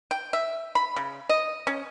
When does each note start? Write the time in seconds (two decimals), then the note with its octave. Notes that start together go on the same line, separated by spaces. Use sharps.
0.11 G5
0.33 E5
0.75 B5
0.96 C#3
1.29 D#5
1.67 C#4